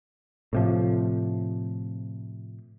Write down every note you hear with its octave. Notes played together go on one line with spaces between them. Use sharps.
A2 C3 F3